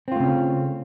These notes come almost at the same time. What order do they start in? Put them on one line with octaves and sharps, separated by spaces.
C4 F4 A3 C#3 C#4